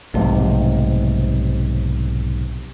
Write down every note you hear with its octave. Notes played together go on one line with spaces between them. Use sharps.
B1 G#2 C3 F3 A3